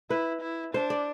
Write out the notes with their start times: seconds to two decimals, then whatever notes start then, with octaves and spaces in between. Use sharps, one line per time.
0.10 E4 B4
0.42 E4
0.74 D4 C5
0.90 D5